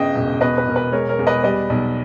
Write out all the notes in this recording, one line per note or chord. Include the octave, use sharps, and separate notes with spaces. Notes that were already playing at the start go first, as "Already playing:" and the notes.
Already playing: G1 C#3 D#5 G5
E1
B2 B4 D#5
B4
E1 A#4
B4
G#3 A#4 C#5
A#4 C#5
E2
B4 D#5
G3 B4 D#5
B1